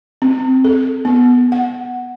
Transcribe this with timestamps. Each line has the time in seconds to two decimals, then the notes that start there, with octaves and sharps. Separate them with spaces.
0.22 C4
0.64 A4
1.05 B3
1.52 F#5